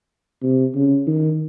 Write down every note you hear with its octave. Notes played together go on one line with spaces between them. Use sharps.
C3
C#3
D#3